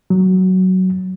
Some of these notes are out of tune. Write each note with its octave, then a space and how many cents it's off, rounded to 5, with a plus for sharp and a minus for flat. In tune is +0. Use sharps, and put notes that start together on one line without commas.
F#3 +10